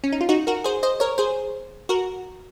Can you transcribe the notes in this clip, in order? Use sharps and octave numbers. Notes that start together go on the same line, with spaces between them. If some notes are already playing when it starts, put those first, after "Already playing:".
C#4
D#4
F4
D#4 F#4
F#4 A#4
G#4 C5
C5 D#5
A#4 C#5
G#4 C5
F#4 A#4